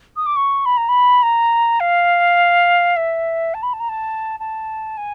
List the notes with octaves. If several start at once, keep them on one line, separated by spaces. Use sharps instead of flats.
D#6
D6
C#6
B5
A#5
B5
A#5
F5
E5
A5
B5
A5
A#5
A5
A5
G#5